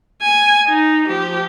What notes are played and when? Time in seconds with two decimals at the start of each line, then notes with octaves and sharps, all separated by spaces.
0.22 G#5
0.68 D#4
1.08 F3 G4